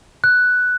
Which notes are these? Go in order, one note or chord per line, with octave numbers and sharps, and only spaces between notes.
F#6